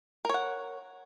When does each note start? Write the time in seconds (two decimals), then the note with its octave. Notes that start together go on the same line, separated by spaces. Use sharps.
0.25 A#4
0.29 C#5
0.34 F#5